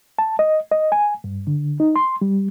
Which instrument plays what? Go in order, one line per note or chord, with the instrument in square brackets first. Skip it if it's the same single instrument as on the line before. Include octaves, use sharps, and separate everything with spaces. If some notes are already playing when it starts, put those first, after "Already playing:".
[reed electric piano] A5
D#5
D#5
G#5
G2
D3
D#4
C6
G3